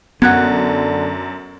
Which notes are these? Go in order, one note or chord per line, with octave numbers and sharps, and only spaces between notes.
F#2 D3 B3 F#5 F#6 G#6